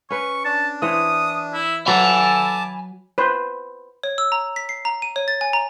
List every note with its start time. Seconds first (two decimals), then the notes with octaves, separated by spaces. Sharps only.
0.10 C#4 B4 C#6
0.45 D4 A5
0.82 E3 C5 C#5 D#6
1.54 E4
1.87 F#3 A4 B4 G#5 A5 B5 D6
3.18 B4 C5
4.03 C#5
4.18 E6
4.32 A#5
4.56 B6
4.69 C7
4.85 A#5
5.02 D#7
5.16 C#5
5.28 A6
5.41 G#5
5.53 A#5